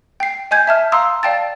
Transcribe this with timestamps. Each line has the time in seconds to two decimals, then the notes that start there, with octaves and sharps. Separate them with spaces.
0.20 G5 C7
0.51 D#5 G#5 G6 G#6
0.67 E5 A5 F6
0.92 F5 A#5 C6 D#6 E6
1.23 D5 F5 G5 A5 A6